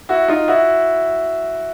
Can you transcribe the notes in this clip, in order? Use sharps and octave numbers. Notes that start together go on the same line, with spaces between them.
E4 F#4
D#4 F4
E4 F#4